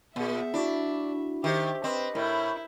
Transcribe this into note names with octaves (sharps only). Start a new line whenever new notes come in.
A#2 B3 G#4 E5
D4 E4 F#4
D#3 G4 C5 E5
C4 B4 D#5
A2 E4 A#4